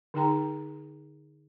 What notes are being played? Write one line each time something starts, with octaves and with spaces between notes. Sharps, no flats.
D3 D#4 G#4 G5 A#5